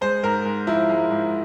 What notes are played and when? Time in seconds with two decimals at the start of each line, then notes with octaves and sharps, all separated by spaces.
0.01 G#3 C5
0.23 G#2 A#4
0.45 G#2
0.67 F3 E4
0.89 G#3
1.11 G#2